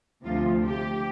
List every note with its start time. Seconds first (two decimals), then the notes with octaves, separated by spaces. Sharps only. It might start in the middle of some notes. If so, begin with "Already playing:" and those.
0.23 D2 C3 F3 F4
0.64 G4